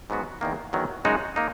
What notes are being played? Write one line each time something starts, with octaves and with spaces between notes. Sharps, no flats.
G#2 F#3 B3 F#4
E2 D#3 A#3
E2 D#3 F#3
F#2 C#3 G#3 D#4 F#4
A#3 D#4